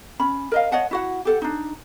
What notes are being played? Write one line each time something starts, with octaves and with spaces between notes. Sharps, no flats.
C#4 B5
A#4 D#5 F5
C#5 D#5 F#5 A5
E4 F#4 F#5
G4 A4 F#5
D4 D#4